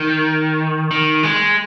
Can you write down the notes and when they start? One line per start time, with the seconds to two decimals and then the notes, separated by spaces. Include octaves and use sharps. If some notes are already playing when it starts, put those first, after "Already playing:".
Already playing: D#3
0.91 D#3
1.23 G#3